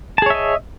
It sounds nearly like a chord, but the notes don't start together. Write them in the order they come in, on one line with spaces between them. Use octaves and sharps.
A5 G#4 C#5 E5 D#5